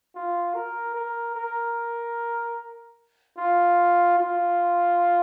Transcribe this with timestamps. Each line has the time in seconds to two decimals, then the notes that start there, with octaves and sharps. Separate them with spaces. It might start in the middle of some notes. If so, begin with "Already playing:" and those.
0.15 F4
0.55 A#4
0.95 A#4
1.35 A#4
3.37 F4
4.18 F4